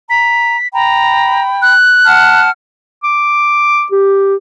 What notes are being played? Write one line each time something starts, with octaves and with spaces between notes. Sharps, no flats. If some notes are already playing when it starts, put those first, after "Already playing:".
A#5 B6
G5 A#5 B5
F#6
F#5 A5 F6
D6
G4